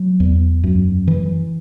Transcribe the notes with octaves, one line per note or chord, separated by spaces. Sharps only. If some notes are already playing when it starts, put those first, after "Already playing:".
Already playing: F#3
E2
F#2
E3